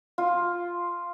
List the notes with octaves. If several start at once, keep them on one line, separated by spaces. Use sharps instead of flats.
F4